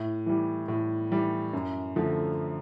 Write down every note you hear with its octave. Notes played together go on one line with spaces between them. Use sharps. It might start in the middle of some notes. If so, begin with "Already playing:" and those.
Already playing: A2
E3 G3
A2
E3 G3
F#2
D3 F3 A3